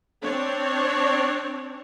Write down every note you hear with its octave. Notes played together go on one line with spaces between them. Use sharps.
C4 D4 C#5